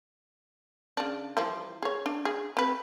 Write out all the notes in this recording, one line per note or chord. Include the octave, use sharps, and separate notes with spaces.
C#3 D4
E3 F3 G3
G#4 C#5
D4
G#4
C4 B4